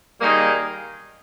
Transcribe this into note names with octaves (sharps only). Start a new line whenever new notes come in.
D#3 G3 A#3 D#4 G#4